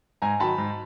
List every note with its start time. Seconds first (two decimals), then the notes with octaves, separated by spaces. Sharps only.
0.22 G#2 G#5 A#5
0.39 D#3 F#3 A5 B5
0.58 G#2